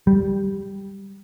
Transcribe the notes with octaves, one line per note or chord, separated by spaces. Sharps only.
G3